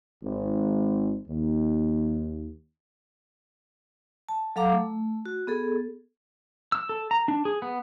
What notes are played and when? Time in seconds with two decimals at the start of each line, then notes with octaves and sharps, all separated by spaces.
0.23 G#1
1.28 D#2
4.29 A5
4.56 F#3 A4 F5 A#5 D6
4.72 A3
5.26 F#4
5.47 B3 G#4 A4
6.72 E6
6.89 A4
7.11 A#5
7.28 D4
7.45 G#4
7.62 B3